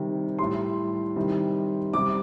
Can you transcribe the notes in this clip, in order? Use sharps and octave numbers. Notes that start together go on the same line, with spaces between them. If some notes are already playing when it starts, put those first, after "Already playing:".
Already playing: C3 D#3 G3
A2 G3 C6
C3 D#3 G3
C3 G3 D6